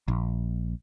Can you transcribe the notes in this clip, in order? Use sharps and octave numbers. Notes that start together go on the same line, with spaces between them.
A#1